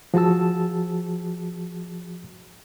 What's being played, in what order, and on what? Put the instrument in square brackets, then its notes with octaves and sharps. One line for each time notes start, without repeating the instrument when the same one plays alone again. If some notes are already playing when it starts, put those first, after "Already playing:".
[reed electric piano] F3 F#4 G#4 A5 E6